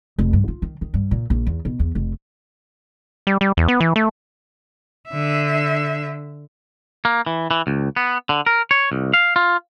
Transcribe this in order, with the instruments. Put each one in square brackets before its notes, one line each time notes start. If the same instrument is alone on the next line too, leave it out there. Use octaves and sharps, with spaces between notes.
[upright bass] F1
G2
F4
D#3
D#3
G2
A#2
A#1
E2
B2
E2
F1
[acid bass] G3
G3
E2
B3
E3
A3
[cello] D3 E5
[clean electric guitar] A#3
E3
E3
C#2
B3
D3
A#4
C#5
C2
F5
F4